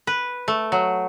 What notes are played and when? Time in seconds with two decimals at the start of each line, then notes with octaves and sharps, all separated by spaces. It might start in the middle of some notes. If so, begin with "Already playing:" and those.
0.07 B4
0.48 A3
0.72 F#3